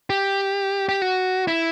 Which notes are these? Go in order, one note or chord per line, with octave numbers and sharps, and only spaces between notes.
G4
G4
F#4
E4